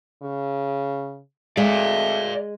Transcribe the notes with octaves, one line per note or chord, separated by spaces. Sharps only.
C#3
G#3 A3 D5 F5